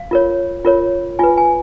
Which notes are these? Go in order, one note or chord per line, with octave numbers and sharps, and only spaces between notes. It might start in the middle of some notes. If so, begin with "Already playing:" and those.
Already playing: F5
F4 A#4 C#5
F4 A#4 C#5
F4 B4 G#5
G#5